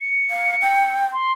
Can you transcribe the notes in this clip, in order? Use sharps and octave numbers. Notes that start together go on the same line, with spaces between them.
C#7
F5
G5
C6